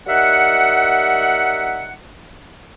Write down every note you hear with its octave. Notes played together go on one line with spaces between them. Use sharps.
G3 D#4 A#4 E5 F#5